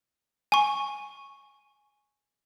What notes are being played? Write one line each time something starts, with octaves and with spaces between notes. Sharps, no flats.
G#5 C#6